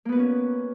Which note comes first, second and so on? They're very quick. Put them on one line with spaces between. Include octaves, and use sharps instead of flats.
A#3 B3 B4 F#4 C#4